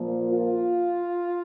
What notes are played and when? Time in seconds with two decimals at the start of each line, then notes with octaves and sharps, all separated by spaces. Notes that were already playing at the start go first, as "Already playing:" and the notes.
Already playing: A#2 F3 A#3
0.29 F4